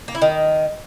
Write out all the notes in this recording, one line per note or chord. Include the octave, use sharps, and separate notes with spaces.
A#3
E4
D#3